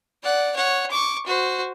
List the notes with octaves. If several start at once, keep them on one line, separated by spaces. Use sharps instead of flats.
D5 F#5
C#5 F#5
C#6 D6
F#4 C5